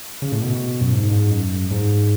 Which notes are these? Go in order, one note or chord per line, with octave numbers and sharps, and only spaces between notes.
C#3
A2
B2
F#2
G#2
G#2
F#2
G#2